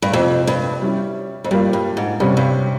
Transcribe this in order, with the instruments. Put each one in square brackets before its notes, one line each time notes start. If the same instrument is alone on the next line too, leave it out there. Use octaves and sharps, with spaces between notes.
[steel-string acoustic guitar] G2
[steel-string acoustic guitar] F2 [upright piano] C3 F3 C4
[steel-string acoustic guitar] G2
[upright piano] G3 C#4 E4
[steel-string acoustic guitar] F2
[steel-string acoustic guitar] G2 [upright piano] G3 A#3 F4
[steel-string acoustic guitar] G2
G#2
[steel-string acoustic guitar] G2 [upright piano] C3 G3 C#4
[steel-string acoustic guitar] G2